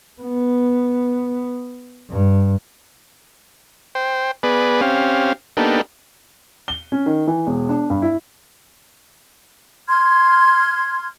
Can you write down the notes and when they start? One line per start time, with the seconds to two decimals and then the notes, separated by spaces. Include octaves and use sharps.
0.22 B3
2.10 G2
3.95 C5 G5
4.43 B3 G#4 B4 D5
4.81 C4 C#4 G4 F5
5.57 A#3 B3 D4 D#4 G4 A4
6.68 G7
6.92 C#4
7.06 D#3
7.27 E3
7.47 E1
7.69 D4
7.90 G2
8.02 E4
9.88 C6 F6 G#6